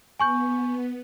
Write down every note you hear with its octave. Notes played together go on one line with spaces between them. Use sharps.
B3 G#5 C#6 G6